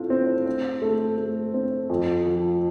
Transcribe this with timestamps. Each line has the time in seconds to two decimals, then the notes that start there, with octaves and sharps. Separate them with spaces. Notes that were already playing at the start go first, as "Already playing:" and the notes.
Already playing: A2 C4 F4
0.10 C4
0.46 C4
0.82 A3
1.18 A3
1.54 C4
1.90 F2
2.26 F3